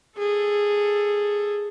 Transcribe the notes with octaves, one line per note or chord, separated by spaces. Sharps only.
G#4 A4